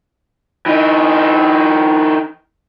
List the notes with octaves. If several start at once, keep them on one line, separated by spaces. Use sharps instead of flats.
E3 D#4